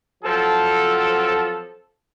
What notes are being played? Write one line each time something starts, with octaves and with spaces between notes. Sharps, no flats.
F3 F#3 C4 A4